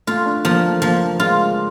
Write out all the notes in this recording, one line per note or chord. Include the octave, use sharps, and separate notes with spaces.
A3 F4
D4
F3 A#3
A3
F3 A#3
G#3 F4